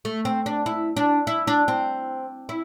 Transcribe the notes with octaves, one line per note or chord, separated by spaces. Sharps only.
A3
C4
D4
E4
D4
E4
D4
C4
E4